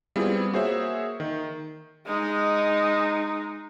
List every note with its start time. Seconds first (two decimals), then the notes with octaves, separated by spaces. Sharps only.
0.16 G3 B3 C4 E4 F4 G#4
0.53 A#3 F#4 G#4 C5 C#5 E5
1.20 D#3
2.06 G#3 D#4